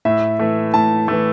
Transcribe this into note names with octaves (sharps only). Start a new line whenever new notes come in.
A2 E5
E3 A3
A2 A5
E3 A3